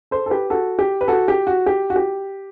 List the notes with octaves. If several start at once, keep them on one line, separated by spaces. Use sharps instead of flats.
A4 C5
A4
G4 B4
F#4 A4
G4
B4
F#4 A4
G4
F#4
G4
F#4
G4